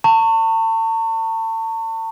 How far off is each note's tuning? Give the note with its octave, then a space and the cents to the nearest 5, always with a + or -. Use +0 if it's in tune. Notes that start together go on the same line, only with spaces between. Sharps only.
A5 +40 C#6 -10